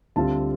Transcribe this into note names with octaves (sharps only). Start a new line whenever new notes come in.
D2 D3 G3 C4 F4 A5